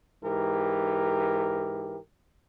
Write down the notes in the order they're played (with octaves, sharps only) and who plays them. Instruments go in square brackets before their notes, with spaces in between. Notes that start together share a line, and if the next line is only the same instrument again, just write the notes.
[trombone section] G#2 E3 G4 A#4